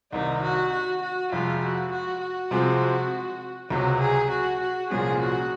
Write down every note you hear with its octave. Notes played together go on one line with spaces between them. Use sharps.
C2 C3 D#3 D#4
F#4
F#4
F#4
F2 C3 F3 G#3 F4
F#4
F#4
F#4
C3 F3 G#3 C4
C#2 C3 F#3 F#4
G#4
F#4
F#4
C2 A#2 F3 G#3 C#4 G#4
F#4